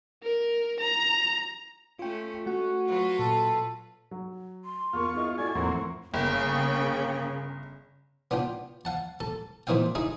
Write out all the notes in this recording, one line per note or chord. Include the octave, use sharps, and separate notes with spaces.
A#4
A#5
A3 C#4 F4 G5
A3 C#4 F#4 F#5
F#3 F4 B4
A#2 A4
F#3
C6
E2 F4 A#4 C#6
B3 E4 G#4 D#5
A3 E4 F#4 D5 G#5 C#6
E2 A2 E3 F3 A#3 C4 F#5
G1 C#3 A#3 G5
B3 D4 F4 G5
F5 F#5 A5
A4 A5
A#2 E3 C4 D#4 F5 G5
D#4 E4 G#4 F5